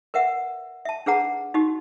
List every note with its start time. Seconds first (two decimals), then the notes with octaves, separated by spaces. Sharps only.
0.14 A#4 B4 E5 F#5
0.85 E5 A5
1.06 D4 G#4 B4 F#5 A#5
1.54 D#4 F#4 G4